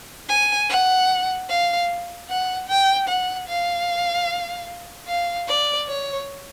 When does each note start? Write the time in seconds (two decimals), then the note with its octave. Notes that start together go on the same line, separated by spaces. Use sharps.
0.29 G#5
0.69 F#5
1.49 F5
2.29 F#5
2.68 G5
3.08 F#5
3.48 F5
5.08 F5
5.48 D5
5.88 C#5